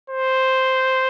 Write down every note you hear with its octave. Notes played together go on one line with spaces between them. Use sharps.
C5